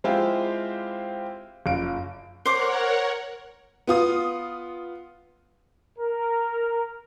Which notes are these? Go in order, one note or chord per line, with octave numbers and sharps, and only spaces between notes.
G#3 C4 E4 F4 G4
F#1 F4 D7
A#4 C5 C#5 F#5 D6
B3 F4 D#6
A#4